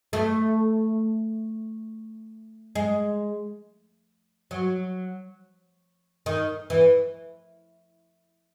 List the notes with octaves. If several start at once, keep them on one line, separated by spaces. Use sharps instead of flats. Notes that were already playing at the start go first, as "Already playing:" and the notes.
A3
G#3
F#3
D#3
E3